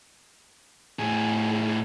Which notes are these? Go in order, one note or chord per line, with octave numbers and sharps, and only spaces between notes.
A2 G#4